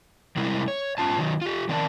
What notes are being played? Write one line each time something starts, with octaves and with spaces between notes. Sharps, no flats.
C3 G3 G#3 C4 E4 A#4
C#5
G#2 D#3 C#4 F4 A5
D#3 F#3
F4 G4
D#3 C4 A#4 D5 F#5 A5